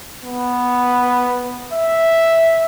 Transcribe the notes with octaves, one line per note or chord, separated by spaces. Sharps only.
B3
E5